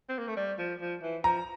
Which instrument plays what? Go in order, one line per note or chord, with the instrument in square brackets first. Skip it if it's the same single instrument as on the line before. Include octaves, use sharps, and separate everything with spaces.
[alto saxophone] C4
A#3
A3
G3
F3
F3
E3
[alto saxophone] F3 [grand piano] A#5